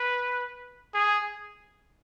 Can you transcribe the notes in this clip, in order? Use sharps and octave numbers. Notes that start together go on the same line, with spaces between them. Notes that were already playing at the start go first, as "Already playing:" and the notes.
Already playing: B4
G#4